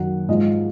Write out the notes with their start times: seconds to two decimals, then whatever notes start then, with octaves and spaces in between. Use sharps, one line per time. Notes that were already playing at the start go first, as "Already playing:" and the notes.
Already playing: F#2 D#3 F#3 F#5
0.29 G#2 F3 G#3 D#5